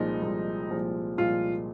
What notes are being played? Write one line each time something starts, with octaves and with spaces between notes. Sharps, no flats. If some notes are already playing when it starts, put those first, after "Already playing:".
Already playing: C2 A#2 F3 G#3 D#4
C2 A#2 F3 G#3
C2 A#2 F3 G#3
C2 A#2 F3 G#3 F4